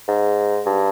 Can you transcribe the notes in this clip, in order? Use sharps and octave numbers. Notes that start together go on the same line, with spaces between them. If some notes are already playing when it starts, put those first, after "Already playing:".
G#2
G2